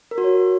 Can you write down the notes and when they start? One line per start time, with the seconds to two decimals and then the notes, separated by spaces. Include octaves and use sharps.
0.11 A#4
0.18 F#4
0.24 C#5